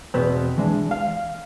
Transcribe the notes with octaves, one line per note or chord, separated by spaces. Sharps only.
E2 B2 B3 C4
E3 G#3 D4
F5